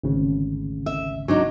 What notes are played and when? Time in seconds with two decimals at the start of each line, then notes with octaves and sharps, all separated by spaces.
0.03 G#1 D2 C#3
0.86 E5
1.28 F#3 D4 D#4